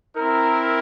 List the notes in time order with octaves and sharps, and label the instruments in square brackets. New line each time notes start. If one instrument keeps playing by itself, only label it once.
[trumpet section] C4 E4 A#4